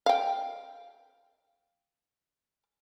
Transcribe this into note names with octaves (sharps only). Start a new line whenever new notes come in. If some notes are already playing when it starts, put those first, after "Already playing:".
F5 G5